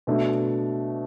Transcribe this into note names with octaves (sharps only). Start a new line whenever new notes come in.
B2 A3 D4